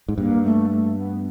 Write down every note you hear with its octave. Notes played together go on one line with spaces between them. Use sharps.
G#2
G2 A#3
A3
A3
B3